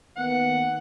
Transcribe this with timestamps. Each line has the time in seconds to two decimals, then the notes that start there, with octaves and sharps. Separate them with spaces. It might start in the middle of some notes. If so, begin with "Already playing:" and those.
0.17 D#3 A#3 B3 F#5